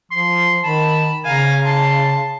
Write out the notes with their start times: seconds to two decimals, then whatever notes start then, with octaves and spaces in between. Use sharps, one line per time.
0.11 F3 C6
0.64 D#3 A5 B5
1.25 C#3 F5 G#5 A#5
1.65 A5 C6